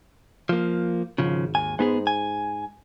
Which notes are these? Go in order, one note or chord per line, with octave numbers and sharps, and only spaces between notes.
F3 A#3
G#1 C#3 F3
D#2 G#5
G#2 G#3 B3 G#4
G#5